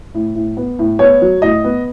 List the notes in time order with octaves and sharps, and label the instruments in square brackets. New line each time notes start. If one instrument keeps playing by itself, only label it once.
[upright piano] A2
A2
B3
A2
B3 C#5
F#3
A2 D#5
B3